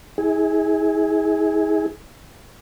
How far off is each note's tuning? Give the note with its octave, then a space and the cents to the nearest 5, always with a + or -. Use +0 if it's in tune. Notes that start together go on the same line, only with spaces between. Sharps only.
E4 -45 G#4 +0